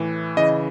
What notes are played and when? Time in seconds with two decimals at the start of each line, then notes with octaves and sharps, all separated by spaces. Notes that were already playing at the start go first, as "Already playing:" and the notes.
Already playing: A2 E3
0.37 C#3 E3 D#5